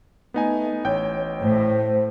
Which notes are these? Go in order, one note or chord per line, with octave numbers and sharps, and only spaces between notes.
A3 B3 D#4 G#5
A1 C#5 G5 G6
A2 C5